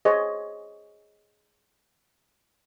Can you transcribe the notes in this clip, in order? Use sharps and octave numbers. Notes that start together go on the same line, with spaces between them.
G#4 C5 C#5 D#5